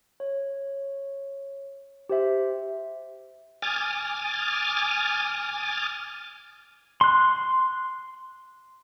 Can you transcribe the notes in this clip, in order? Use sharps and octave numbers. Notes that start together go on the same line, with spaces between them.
C#5
G4 C5 E5
G#5 D6 D#6 F6 A6
C6 F#6